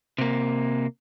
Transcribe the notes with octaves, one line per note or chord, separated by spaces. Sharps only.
C3 A#3